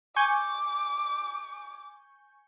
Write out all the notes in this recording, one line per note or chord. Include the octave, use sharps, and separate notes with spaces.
G#5 C#6 D6 G6